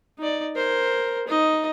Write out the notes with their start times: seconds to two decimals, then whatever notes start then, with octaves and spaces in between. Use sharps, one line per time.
0.19 D#4 D5
0.55 A#4 C5
1.28 D#4 D#5